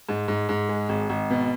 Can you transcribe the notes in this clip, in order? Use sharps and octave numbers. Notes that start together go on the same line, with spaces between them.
G#2
G#2
G#2
G#3
G#1
G#1
B2